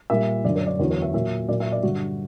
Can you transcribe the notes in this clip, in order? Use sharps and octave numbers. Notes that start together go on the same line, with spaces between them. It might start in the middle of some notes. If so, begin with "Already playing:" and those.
A#2 G3 E5
F#2 D3 F#3 D5
C#5
D5
E2 D3 F#3 C#5
C#5
E5
A#2 F#3 E5
A#2 F#3 D5
E5
D5
G2 D3 F#3 F#4